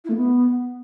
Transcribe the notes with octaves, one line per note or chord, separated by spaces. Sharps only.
E4
A3
B3